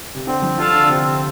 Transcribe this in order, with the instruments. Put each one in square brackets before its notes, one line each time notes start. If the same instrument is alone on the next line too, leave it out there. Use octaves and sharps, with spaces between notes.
[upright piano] C3
[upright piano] D3 [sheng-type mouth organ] C4
[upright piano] F3
[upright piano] D3 [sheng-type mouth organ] F4 A4 F5 A5
[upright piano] D3
D3
[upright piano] C3 [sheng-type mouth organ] C4